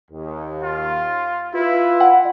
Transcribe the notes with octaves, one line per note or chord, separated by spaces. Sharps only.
D#2
F4
E4 F4 B4
F#5